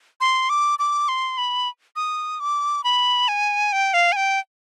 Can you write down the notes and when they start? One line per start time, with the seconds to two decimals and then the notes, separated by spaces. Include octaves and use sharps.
0.21 C6
0.49 D6
0.79 D6
1.08 C6
1.38 B5
1.96 D#6
2.40 D6
2.84 B5
3.28 G#5
3.73 G5
3.94 F5
4.12 G#5
4.16 G5